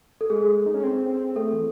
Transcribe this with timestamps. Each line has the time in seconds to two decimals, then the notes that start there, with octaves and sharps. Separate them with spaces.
0.21 A4
0.30 G#3 G#4
0.66 D#4
0.74 C#4
0.83 C4
1.10 C4
1.36 A3 A4
1.53 E3